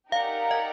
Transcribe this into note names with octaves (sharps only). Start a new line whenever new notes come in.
D#4 G4 A#4 D5 F5 F#5
D#5